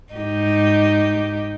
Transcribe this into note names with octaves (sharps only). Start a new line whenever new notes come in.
G#2 D#4 G4